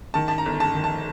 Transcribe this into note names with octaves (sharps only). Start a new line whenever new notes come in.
D#3 A5
A5
A#5
G1
A5
D#3
A5